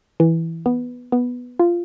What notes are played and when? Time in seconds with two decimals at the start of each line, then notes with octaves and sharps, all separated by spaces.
0.20 E3
0.66 B3
1.12 B3
1.59 F4